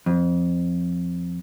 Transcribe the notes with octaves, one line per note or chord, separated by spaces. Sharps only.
F2